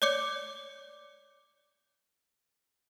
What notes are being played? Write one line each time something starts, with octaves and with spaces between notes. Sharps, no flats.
C#5 D5 D6 G6 C#7